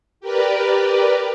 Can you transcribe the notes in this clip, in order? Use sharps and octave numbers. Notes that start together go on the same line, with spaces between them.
G4 A#4 B4 D5